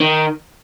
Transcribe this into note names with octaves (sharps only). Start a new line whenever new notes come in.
D#3